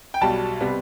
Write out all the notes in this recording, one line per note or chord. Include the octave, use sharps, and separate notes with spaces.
G5
B1 B2 G3 A5
C3 G3 B3